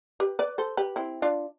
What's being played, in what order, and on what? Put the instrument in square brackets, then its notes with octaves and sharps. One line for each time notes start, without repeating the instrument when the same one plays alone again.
[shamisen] G4 B4
B4 D5
A4 C5
G4 B4
C4 E4
D4 F4